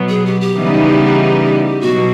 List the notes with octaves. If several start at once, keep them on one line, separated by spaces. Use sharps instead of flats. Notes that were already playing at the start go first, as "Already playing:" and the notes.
Already playing: B2 F#3 B3
G#4
G4
G4
C#3 E3 G3 B3 D#4
B2 F#3 F#4